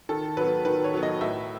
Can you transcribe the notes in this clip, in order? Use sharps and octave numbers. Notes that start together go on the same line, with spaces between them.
D#3 A4
F#3 B3 B4
D#3 B4
C#5
F#3 B3
D#5
A2 E5